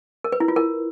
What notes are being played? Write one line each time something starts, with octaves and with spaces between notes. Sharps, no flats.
A#4
B4
E4
F4
A#4